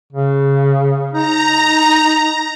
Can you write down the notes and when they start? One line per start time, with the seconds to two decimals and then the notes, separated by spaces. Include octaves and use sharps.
0.13 C#3
1.13 D#4 A#5